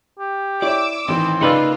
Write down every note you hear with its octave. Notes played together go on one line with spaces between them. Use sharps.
G4
E4 C#5 D5 D6 E6
A1 D#3 E3 C4
C#3 A#3 D#4 F4 B4 D5 E6